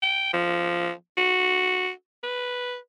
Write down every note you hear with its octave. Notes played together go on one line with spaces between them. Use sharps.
G5
F3
F#4
B4